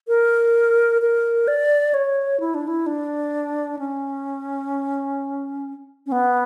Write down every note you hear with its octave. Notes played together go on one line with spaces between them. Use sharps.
A#4
A#4
D5
C#5
E4
D4
E4
D4
C#4
C#4
B3